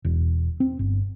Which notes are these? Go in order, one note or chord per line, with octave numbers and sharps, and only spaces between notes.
E1
C4
G1